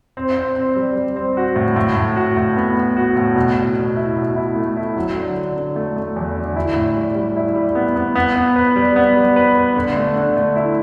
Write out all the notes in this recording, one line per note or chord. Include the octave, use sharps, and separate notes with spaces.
C4
C4
C4
G3
G3
C4
F#4
A2
A2
A2
F#4
A2
B3
B3
F#4
A2
B2
B2
B2
E4
B2
E4
A3
E4
F#3
D3
D3
D3
A3
A3
E2
D3
E4
A2
G3
G3
E4
G3
B3
B3
B3
B3
B4
G3
B3
G3
B4
B4
D3
A3
D3
A3
E4